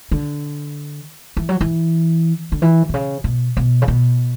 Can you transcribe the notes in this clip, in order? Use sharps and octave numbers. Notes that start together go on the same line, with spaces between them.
D3
E3
F#3
E3
D3
E3
B2
C#3
B2
B2
C#3
B2